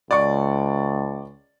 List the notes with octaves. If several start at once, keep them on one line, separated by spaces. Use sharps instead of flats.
C#2 D5 C#6